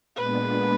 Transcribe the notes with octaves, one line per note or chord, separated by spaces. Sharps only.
A#2 G#3 B3 D4 B4